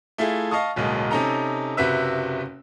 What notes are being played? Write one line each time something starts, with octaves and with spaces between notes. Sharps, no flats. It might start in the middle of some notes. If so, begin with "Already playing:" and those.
A3 E4 F4 G#4
D#5 F5 A5 C#6 D#6
D1 B1 B2 G#3 A#3
C3 C#4 D#4 A4 A#5
F#1 C3 F#4 B4 E5 E6